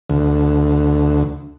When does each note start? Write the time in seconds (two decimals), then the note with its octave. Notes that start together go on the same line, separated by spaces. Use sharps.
0.10 D2